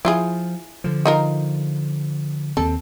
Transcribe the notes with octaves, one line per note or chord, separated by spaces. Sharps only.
F3 E4 F4 G#4
D3 F3
D#4 F4 A#4
D#2 C4 A4